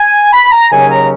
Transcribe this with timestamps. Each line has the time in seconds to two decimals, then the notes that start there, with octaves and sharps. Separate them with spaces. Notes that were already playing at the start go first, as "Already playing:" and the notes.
Already playing: G#5
0.32 B5
0.52 A#5
0.70 D#2 C#3 F#3 C#4 G#5
0.90 A#5